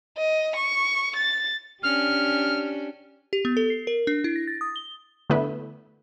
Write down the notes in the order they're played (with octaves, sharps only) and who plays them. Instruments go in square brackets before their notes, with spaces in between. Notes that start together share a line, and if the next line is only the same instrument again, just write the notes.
[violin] D#5
C#6
A6
[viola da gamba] C#4 D4 G4 [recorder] F6
[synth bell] G4
B3
A4
C7
A#4
D4
E4
A#6
A6
D#6
G7
[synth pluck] D3 A3 B3 E4 B4